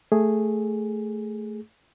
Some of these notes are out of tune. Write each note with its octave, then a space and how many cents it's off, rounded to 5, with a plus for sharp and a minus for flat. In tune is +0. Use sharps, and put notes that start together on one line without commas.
A3 +0 G#4 +0